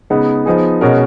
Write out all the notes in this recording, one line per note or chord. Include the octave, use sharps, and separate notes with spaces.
C#3 G#3 B3 D#4
F3 B3 D#4 G#4
B2 G#3 C#4 F#4 A#4